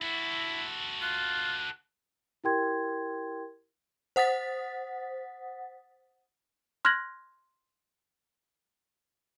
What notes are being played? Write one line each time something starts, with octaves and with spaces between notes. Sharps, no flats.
E4 F#4 A4
F4 F#6
E4 G4 A#4 G5 C6 G#6
C5 F#5 D#6 A6 B6
C6 F6 F#6 G#6 A#6 F#7